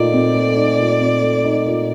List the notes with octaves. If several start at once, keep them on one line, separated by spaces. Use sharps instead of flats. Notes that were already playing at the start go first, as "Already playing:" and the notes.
Already playing: A#2 A3 D#4 D5
C4
A3
D#4
A#2
C4
A3
D#4
A#2